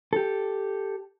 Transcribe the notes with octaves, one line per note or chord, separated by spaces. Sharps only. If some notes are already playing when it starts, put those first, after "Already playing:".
G4 A4